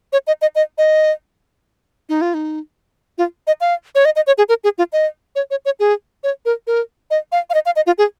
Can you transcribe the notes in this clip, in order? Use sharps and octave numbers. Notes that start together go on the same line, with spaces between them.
C#5
D#5
D#5
D#5
D#5
D#4
F4
D#4
F4
D#5
F5
C#5
D#5
D#5
C#5
G#4
A#4
G#4
F4
D#5
C#5
C#5
C#5
G#4
C#5
A#4
A#4
D#5
F5
F5
D#5
F5
D#5
F4
G#4